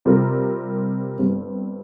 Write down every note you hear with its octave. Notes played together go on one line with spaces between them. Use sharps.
C3 G3 C4 F4 A#4
G1 G2 G3 C4